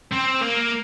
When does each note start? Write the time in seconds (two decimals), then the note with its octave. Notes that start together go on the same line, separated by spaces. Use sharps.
0.12 C4
0.42 A#3